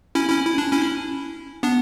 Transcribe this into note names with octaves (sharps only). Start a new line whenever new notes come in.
C#4 E4
C#4 E4
E4
D4
C#4 E4
B3 D4